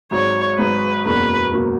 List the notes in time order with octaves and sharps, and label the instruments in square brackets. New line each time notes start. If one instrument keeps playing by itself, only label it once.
[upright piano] G#1 G#2 F#3 [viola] C#5
[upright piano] G#1 G#2 F#3 [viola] B4
[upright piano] F#1 E2 B2 F#3 A#3 [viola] B4
[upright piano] B2 F#3 A#3